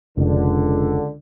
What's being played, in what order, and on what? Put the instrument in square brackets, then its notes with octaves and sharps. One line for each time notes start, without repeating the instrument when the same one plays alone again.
[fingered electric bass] F1 [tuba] C#2 [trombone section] D3